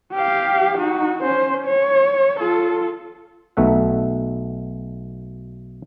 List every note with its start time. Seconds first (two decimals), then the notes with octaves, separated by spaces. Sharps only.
0.13 G4 F5
0.79 D#4 F#4
1.24 C#4 C5
1.66 C#5
2.39 F4 A4
3.57 B1 B2 A3 E5 F#5